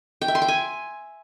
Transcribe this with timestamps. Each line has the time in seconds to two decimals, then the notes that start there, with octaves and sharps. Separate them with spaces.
0.21 G5
0.28 E5
0.35 C6
0.42 G5
0.48 G#5